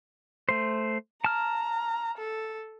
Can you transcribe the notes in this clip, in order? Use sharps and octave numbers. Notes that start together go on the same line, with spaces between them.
A3 C5
A5 A#5 F6
A4